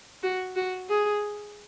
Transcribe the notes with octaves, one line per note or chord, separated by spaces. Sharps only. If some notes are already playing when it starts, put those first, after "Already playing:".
F#4
F#4
G#4